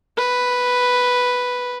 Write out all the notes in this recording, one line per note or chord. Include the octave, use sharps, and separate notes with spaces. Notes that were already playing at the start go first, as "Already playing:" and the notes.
B4